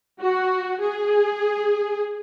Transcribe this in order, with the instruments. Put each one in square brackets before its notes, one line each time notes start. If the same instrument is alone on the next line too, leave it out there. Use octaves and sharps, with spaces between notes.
[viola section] F#4
G#4